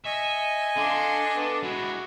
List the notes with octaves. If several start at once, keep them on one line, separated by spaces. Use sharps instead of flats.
D#5 E5 G#5 C#6
D4 A4 F5 C6
B3 A4
G#3 E4 F#4